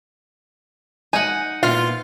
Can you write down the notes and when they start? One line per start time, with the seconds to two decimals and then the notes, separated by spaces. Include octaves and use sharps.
1.13 D#4 F#5 G#5
1.63 E2 A#2 E3 F4 F5